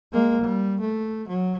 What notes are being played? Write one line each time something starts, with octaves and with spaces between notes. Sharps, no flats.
G#3 A#3
G3
A3
F#3